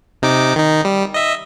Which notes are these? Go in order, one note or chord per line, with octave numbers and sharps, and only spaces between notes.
C3 D#4 D6
D#3 D#4
G3
D#5 E5